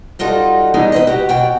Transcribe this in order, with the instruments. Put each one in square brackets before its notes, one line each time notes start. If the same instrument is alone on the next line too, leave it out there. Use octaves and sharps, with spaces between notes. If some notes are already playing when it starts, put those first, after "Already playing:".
[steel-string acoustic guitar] G3 D#4 F4 F#4 A4
E3 G3 B3 D#4 G#4
B4 C5 D#5
F#4 G4
B2 F#4 G5